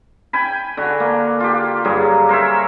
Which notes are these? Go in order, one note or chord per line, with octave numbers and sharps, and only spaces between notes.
G5 G#5 B5
D3 F#4
A#3
F4 G4
G2 F#3 G#4
A#4 C5 C#5 E5